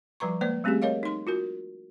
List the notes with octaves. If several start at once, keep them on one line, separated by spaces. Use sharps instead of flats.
F3 G3 B4 A#5 C#6
G#3 A#3 B4 C5 D5
G3 A3 C4 C#4 G4 G#4
A#4 C#5 D#5 F5
D#4 C6
F4 F#4 A#4